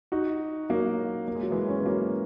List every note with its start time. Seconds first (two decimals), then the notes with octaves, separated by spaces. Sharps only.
0.12 D#4 F#4
0.70 F#3 A#3
1.28 A#3
1.35 G#3
1.43 F#3
1.51 E3 G#3
1.69 C#4
1.78 B3
1.85 F#3 A#3